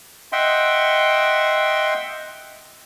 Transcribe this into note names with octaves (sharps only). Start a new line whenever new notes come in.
D#5 E5 F#5 G5 C6